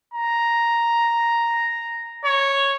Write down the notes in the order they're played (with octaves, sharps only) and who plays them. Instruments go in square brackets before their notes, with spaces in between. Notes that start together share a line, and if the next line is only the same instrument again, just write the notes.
[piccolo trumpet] A#5
C#5